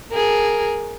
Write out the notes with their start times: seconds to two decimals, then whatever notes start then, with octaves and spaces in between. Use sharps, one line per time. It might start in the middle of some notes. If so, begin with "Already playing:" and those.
0.12 G#4 A#4